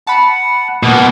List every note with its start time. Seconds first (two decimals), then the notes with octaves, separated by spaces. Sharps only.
0.07 F#5 A5 B5
0.83 B2 A#3 B3 F#5